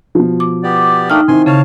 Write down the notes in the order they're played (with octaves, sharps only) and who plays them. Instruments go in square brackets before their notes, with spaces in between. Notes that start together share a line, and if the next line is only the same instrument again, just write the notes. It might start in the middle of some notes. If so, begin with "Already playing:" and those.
[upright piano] B2 F3
[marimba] D6
[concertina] B3 G4 D5
[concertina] A3 A#3 D4 [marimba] D#4 G5 F6
[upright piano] D#3 C4 E4 [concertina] G#5 C6
[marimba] C#3 [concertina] C#5 F5 A5